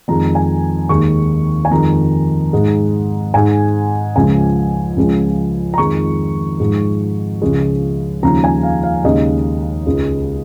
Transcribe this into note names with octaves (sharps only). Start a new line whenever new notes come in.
F2 D#3 G#3 A#5
G#5
D#2 D#3 G#3 C#6
G#5
F2 D#3 G#3 A#5
G#2 G#3
G#2 G#3 G#5
C#2 C#3 F3 G#3 G#5
C#2 C#3 F3 G#3
A#5
F2 D#3 G#3 C#6
G#2 F3 G#3
C#2 C#3 F3 G#3
D#2 C#3 F3 G#3 A#5
G#5
F5
F5
D#2 C#3 G#3 D#5
C#2 C#3 G#3